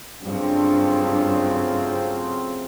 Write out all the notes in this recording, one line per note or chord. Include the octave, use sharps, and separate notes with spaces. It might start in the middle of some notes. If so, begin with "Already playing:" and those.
G2 C#3 F#3 A3 C4 F4